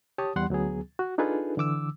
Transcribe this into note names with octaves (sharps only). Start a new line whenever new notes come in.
G4 C#5 A5 D#6
E2 G3 F#5 C6
D2 F#3 B3 G#4
F#4
D4 D#4 F4 G#4 A4 B4
D3 E3 D6 E6